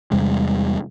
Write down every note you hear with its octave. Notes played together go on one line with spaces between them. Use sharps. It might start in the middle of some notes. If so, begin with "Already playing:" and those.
E2 C3 G3 G#3